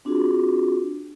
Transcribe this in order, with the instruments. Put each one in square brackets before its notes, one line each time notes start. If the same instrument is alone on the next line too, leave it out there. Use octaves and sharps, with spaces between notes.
[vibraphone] C4 D4 F4 F#4 G#4